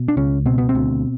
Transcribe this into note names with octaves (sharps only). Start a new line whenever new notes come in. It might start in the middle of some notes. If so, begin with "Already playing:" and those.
Already playing: B2
D4
C#2 C#4
B2 C4
B3
C4
D2